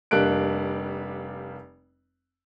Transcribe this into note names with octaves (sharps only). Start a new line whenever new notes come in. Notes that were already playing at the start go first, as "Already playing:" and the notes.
F1 G3 A#3 D4 F#6 D7